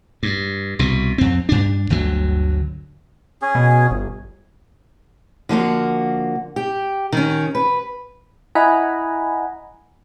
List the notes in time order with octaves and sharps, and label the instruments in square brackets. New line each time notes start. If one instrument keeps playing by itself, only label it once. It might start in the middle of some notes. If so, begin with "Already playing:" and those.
[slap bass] G2
C2 B2
F2 C4
G2 D4
G1 D2 D3 F#3
[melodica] C#4 G#4
[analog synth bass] B2
G1
[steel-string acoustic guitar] D3 F3 A#3 F#4
G4
D#3 C#4
B4
[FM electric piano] E4 D#5 F#5 G#5 A#5 B5